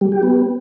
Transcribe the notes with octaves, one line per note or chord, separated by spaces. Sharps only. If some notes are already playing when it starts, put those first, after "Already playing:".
G3
G4
B3